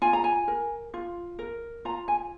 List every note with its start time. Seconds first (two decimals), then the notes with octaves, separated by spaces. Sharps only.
0.02 F4 G#5
0.13 A#5
0.24 G#5
0.48 A#4
0.94 F4
1.39 A#4
1.85 F4 A#5
2.08 G#5